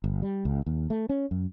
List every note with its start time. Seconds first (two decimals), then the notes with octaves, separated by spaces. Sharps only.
0.04 G1
0.22 G3
0.45 C#2
0.66 D#2
0.90 A3
1.09 C#4
1.31 F#2